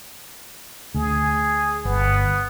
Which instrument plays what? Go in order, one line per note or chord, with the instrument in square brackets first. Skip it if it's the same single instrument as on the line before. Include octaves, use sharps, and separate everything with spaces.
[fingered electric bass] D2 [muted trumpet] G#4
[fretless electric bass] G1 [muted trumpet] B3